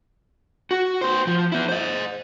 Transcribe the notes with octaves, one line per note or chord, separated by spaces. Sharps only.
F#4
B3 C5
F3
B3 E4
C5 D#5